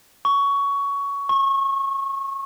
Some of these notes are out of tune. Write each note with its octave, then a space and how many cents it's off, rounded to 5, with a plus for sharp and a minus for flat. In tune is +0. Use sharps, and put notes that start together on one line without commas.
C#6 +15
C#6 -25